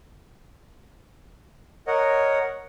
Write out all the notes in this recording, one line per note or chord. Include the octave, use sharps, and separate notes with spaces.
A#4 C#5 D#5 F#5